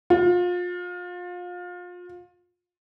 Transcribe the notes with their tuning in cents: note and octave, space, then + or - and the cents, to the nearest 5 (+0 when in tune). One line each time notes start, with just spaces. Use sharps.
F4 +30